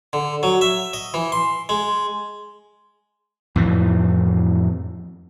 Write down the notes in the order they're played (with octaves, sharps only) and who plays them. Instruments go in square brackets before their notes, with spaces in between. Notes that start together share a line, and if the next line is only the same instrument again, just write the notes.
[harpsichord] D3
F#3
E5
D#5
E3
C6
G#3
[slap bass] F2 A2 E3